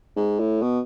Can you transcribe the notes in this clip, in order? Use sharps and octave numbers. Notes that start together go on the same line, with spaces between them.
G#2
A2
B2